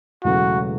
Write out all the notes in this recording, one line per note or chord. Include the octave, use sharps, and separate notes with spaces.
E1 E2 C#3 F#3 A3 F#4